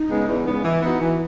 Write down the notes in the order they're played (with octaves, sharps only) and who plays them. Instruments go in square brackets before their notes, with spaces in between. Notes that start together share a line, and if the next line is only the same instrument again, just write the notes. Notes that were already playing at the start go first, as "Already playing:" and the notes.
Already playing: [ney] D#4
[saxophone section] C#3 G#3 B3
E2
C#3 G#3 B3
[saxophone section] E3 [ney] E4
[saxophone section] B3 D#4 F#4
E3